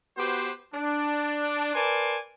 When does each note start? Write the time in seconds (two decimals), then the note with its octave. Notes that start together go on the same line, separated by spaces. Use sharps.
0.17 B3 F#4 G4 B4 C5
0.73 D4
1.75 A#4 B4 D5 G#5 A5 C6